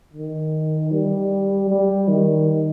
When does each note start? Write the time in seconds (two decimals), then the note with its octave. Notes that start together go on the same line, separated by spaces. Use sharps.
0.13 D#3
0.91 G3
1.69 G3
2.08 D#3